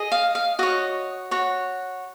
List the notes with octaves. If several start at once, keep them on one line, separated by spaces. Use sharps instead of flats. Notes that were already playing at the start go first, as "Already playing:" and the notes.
Already playing: G#4 D#5
F5
F5
F#4 C#5 D#5
F#4 C#5